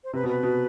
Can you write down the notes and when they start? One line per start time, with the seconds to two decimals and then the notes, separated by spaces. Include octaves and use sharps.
0.04 C5
0.13 C3 B4
0.23 B2
0.29 B4
0.43 B2